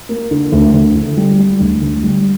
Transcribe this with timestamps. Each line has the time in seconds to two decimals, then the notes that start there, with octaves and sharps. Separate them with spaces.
0.09 A#3
0.31 D3
0.52 D2
0.74 D2
0.95 D3
1.17 G3
1.38 G3
1.60 D2
1.82 D2
2.03 G3